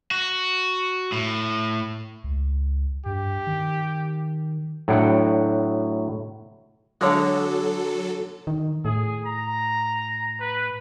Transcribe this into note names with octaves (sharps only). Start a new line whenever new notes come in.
F#4
A2
C#2
G2 G4
D#3
A2 F#3 D4 F#5 G5
D3 F#3 G#3 F#4 A4 C#5 F#5
D#3
A2 G#4
A#5
B4